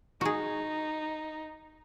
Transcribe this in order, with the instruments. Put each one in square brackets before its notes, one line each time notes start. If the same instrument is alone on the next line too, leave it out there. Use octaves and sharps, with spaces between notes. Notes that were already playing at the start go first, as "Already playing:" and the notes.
[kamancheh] D#4 [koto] F#4 G#4